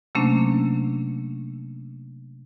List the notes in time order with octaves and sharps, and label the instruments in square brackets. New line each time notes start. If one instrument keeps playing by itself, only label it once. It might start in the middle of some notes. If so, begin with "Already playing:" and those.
[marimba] C3 F#3 A3 A#3 C#4 D4